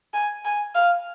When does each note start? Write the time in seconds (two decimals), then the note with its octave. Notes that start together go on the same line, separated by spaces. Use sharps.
0.14 G#5
0.45 G#5
0.75 F5